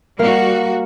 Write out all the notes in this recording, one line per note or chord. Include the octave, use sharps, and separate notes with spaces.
G3 A#3 F#4 A#4 F5